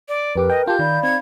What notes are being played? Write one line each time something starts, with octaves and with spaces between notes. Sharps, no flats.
D5
F2 G4 A#4 B4 D6
D#5 G5
F4 G4 A5 G6
D#3 D#4 D5 F5 B5
C4 G#6